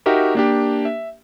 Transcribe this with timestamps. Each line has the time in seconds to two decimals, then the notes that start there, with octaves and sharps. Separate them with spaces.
0.06 D#4 F#4 G4 A#4 E5
0.35 A#3 D4 G4
0.85 E5